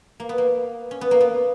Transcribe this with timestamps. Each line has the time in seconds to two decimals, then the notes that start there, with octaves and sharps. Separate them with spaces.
0.20 A#3
0.29 B3
0.38 A#3
0.91 C#4
1.01 B3
1.11 A#3
1.21 B3